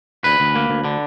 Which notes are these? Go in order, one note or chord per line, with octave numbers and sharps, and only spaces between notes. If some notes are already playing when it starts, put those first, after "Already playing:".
D2 B4
D2
A#3
D2
D3